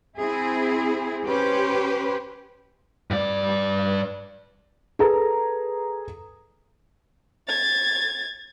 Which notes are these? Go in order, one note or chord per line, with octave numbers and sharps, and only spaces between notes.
C4 E4 G#4
C#4 G4 B4 C5
G2 D5
G#4 A4 B4 A#5
G#6 A6